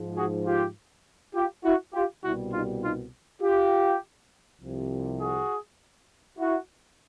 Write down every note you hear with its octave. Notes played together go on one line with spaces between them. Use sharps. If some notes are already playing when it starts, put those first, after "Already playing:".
Already playing: G#2 F3
F#4 G#4
F4 G4
F4 G4
E4 F#4
F4 G4
C2 B2 G3 E4 F#4
D#4 F4
D#4 F4
F4 G4
C2 C3 F3
F#4 G#4
E4 F#4